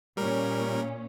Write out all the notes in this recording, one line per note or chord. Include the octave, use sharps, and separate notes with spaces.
A#2 G3 C#4 A#4